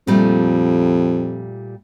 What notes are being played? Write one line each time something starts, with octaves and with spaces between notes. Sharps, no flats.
F2 A#2 G3 A3